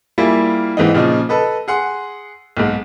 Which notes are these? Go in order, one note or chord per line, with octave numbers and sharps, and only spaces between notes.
G3 A#3 E4 F4 G#4
G#2 E3 C4 D#4
A#2 C#3 F3 D#4
A4 B4 D#5
G#4 F#5 C6
B1 G#2